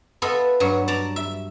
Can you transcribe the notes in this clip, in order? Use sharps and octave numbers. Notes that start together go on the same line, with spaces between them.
B3 F4 A4 D#5 E5
G2 F#3
D5 A5 A#5
E5